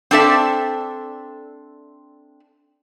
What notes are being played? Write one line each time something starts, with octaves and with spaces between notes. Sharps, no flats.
C4 D4 A4 E5